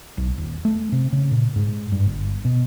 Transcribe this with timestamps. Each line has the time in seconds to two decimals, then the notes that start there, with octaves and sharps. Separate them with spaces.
0.18 B1
0.38 D#1
0.65 A3
0.92 C3
1.12 C#3
1.31 A#2
1.56 G#2
1.92 G2
2.06 G1
2.45 B2